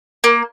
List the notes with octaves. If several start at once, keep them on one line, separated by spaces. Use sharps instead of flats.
A#3